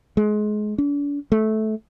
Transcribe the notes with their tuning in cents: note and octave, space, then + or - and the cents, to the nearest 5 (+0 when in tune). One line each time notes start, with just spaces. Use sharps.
G#3 +25
D4 -40
A3 -15